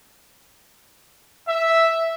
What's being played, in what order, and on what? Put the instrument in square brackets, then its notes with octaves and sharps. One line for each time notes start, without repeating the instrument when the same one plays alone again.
[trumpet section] E5